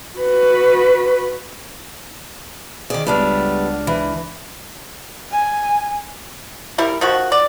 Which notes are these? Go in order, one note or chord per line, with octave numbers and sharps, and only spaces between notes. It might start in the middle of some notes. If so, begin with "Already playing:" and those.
F#4 B4
D#3 G#4 D5
C#2 G3 A3 B3 D4 F6
E3
G#5
G3 E4 A#4
D#3 F3 F#4
D5